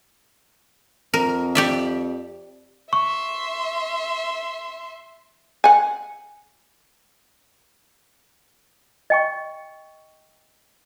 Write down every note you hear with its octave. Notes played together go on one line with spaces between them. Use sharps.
F2 A#4
G4 D5 E5
E5 C6 C#6
F#5 G#5
D#5 G5 C#6